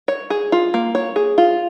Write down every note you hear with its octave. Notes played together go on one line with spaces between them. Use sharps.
C#5
G#4
F4
A#3
C#5
G#4
F4